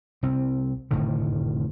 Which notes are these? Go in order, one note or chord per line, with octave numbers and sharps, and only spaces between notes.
C2 C4
F1 A2 D3 D#3